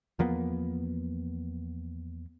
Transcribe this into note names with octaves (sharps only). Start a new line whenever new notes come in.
E2 F3 A#3 B3